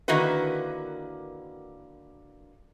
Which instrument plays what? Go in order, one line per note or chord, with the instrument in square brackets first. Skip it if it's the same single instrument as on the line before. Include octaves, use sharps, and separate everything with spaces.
[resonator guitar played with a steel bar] D3 D#3 A#3 E4 F#4 B4